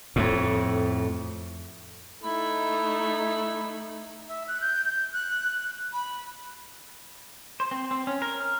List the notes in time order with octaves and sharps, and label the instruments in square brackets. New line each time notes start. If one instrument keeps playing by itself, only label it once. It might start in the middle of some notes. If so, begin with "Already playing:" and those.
[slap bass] F2 A2
[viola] A3 D#4 [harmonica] E4 B5
[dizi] E5
F#6
G6
G6
F#6
B5
[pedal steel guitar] C5
C4
C4
C#4
A#4
F6